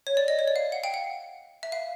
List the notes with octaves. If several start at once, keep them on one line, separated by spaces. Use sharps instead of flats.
C#5
D5
D#5
C#5
D5
F5
F#5
F5 G5
F#5
E5
F5